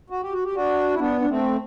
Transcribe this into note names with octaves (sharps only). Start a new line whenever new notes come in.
F#4
G4
F#4
G4
D4 F#4
E4
B3 D4
D4
A3 C4